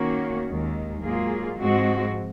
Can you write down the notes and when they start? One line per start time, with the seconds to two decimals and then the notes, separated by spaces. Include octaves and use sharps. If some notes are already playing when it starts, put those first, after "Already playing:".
Already playing: D#3 A#3 C#4 F#4
0.47 D#2 D#3 G#3
1.04 G#2 F#3 A#3 F4 G#4
1.59 G#2 F3 G#3 C4 F#4